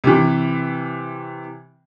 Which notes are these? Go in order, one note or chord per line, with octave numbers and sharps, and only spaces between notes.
C3 E3